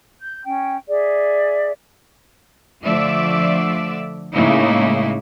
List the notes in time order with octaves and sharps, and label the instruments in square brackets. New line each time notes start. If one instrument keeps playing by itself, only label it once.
[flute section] G6
C#4 G5
G#4 D5 E5
[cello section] D3 F3 A3 D5 E5
A2 C#3 G#3 A#3 D#4 E4